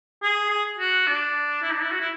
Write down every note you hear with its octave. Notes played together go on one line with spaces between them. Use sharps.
G#4
G#4
F#4
D4
E4
D4
E4
F#4
E4